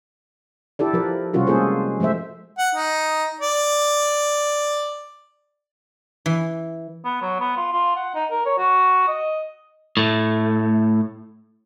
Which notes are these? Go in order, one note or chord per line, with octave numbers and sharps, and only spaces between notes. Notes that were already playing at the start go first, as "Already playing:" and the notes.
E4 G4 A4 D5
F3 A#4 B4
C3 G3 C#4 F4 F#4 A#4
G#3 A#3 F4 G#4 A4 C5
F3 G#3 A3 C5 E5
F#5
D#4
D5
E3
B3
F#3
B3
F4
F4
F#5
D#4
A#4
C#5
F#4
D#5
A2 A3